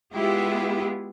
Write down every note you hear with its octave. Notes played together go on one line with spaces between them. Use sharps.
G#3 B3 E4 F4 G4 G#4